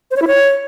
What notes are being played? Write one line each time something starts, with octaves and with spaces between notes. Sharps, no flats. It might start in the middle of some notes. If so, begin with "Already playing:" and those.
C5
C#5
E4
C#5